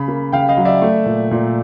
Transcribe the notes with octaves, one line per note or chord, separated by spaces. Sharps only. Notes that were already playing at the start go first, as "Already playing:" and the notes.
Already playing: C#3 B5
A#3
C#3 F5 G5
D#5 F5
F#3
D5 E5
A3
A#2
A#2